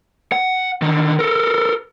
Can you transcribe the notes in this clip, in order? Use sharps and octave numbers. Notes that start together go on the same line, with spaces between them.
F#5
D3 D#3
A4 A#4